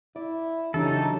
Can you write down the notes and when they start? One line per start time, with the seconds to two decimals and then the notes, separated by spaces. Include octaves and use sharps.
0.16 E4 D5
0.74 C#3 E3 F#3 D4 D#4 G4 A4